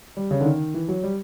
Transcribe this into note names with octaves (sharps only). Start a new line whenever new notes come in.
G3
C#3
D3
D#3
E3
F#3
G3